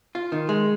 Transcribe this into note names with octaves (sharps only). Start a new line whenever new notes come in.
F4
D#3
G#3